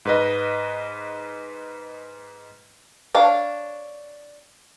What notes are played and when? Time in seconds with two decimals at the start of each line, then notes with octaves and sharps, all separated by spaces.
0.05 G#2 B4 D#5
3.15 D4 C#5 F5 A5